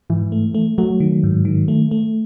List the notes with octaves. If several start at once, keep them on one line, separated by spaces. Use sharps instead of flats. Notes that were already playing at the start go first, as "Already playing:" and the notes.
G#2 E3
A3
A3
F#3 A3
D#3
G#2
D#3
A3
A3